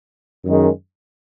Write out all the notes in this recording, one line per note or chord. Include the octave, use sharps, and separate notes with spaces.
F#2 D#3 G#3